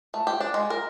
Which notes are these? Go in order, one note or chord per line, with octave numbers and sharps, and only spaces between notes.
A3
G4
D4
G#3
A#4